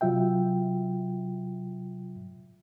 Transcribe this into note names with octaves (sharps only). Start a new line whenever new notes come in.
C3 F#3 F4 E5 G5